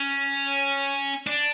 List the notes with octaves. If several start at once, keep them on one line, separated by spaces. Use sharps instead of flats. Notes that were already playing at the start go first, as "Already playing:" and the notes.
Already playing: C#4
D4